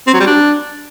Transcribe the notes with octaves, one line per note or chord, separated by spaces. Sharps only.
C4
F#3
G3
D4